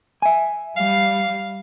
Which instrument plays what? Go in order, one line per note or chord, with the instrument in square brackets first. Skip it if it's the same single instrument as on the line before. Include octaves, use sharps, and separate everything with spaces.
[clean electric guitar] E5 G#5
[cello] G3 [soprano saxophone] F5